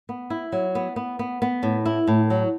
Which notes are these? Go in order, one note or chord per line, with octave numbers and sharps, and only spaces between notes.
B3
E4
F#3
B3
B3
B3
B3
A2
E4
A2
F#3